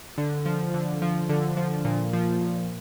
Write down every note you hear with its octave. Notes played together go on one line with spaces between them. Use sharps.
D3
F3
D3
F3
D3
F3
A#2
F3
A#2